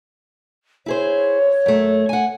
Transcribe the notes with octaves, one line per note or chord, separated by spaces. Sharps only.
E4 G#4 C5 C#5
F#2 A3
F#5 G#5